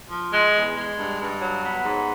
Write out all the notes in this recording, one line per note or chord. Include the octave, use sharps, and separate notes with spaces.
F3
G#3
E2
G#3
G2
G2
F#3
B3
G#2